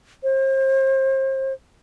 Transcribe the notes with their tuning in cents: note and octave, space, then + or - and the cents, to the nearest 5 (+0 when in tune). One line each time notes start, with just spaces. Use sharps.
C5 +35